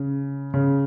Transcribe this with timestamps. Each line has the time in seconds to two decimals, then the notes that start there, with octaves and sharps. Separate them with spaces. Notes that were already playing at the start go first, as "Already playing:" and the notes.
Already playing: C#3
0.54 C#3